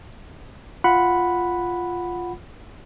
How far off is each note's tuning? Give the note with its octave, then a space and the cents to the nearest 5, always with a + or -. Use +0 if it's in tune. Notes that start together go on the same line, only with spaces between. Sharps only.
F4 +0 F#5 +0 B5 +0